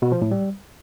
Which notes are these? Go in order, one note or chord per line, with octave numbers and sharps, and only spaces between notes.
B2
F3
A2
G3